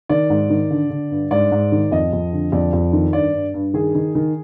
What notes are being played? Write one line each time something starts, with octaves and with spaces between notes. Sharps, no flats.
D#3 D5
G#2
D#3
D3
D3
G2
G#2 D5
G#2
D#3
F2 D#5
F2
D3
F2 D5
F2
D#3
G2 D5
G2
G2
D#3 G#4
D#3
D#3